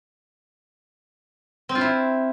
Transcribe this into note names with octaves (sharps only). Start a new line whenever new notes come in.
C4
F4
E4